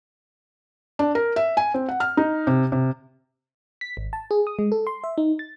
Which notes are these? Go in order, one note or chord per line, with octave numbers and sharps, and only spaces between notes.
D4
A#4
E5
G#5
C4
F#5
F6
D#4
C3
C3
B6
G#1
A5
G#4
D#6
G#3
A4
C6
E5
D#4
A6